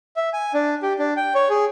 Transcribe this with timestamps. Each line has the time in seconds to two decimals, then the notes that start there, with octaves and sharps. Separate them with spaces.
0.16 E5
0.33 G#5
0.54 D4
0.83 G4
0.99 D4
1.16 G5
1.35 C#5
1.50 G#4